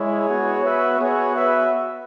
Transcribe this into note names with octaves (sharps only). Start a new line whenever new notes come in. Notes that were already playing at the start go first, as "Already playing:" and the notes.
Already playing: G#3 E4 G#4 C#5
B3 F#4
B4 E5
B3 F#4 G#4 C#5
B4 E5